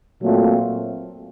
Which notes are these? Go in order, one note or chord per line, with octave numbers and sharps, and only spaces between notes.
A#2 F#3 A3 C4 F4